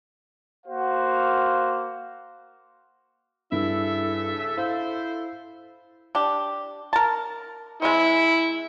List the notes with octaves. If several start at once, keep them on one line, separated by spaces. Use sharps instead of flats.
A#3 F#4 C5 F5
G2 C#3 E4 A4 E5
E4 C5 F5
D4 G4
A#4 A5
G#3 C4 E4